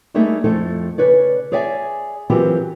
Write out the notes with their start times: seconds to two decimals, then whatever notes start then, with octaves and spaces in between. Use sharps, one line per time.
0.14 G3 A3 A#3 D#4 G#4 E5
0.44 F2 F3 A3 E4 A4
0.98 C#3 B4 C#5 D5
1.52 G#4 C#5 D5 E5 G#5
2.30 E3 F#3 C4 F4 G4 A#4